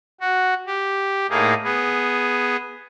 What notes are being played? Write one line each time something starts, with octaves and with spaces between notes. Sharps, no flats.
F#4
G4
A2 A#3 D#4 G#4
B3 G#4